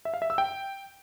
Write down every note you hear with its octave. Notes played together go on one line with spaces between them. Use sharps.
E5
F5
E5
E6
G5